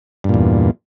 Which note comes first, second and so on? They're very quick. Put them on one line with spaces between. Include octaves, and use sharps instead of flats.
G2 A#2 E2